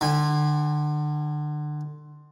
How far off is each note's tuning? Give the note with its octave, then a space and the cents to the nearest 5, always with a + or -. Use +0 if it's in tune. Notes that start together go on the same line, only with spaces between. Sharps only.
D3 +30 G#5 -35